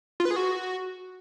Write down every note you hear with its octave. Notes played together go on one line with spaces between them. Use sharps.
F4
B4
G#4
F#4